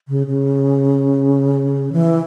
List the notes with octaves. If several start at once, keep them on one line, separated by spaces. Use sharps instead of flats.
C#3
C#3
E3